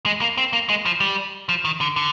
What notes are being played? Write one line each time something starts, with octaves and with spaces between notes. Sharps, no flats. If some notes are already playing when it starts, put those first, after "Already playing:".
G#3
A#3
C4
A#3
G#3
F3
G3
F3
D#3
D3
D3